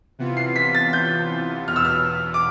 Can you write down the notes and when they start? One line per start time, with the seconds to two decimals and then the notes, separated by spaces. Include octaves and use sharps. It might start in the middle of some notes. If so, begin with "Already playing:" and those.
0.19 C3 E3 B3 F4
0.37 C7
0.56 B6
0.75 A6
0.93 G6
1.68 E2 B2 B3 F6
1.76 E6
1.85 F6
2.34 D6